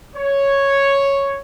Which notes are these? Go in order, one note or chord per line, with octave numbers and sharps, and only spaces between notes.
C#5